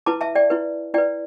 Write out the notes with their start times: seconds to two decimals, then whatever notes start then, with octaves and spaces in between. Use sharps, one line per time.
0.06 E4 B4 A5 D6
0.21 E5 A5
0.35 D5 G5
0.50 E4 B4
0.94 E4 B4 D5 G5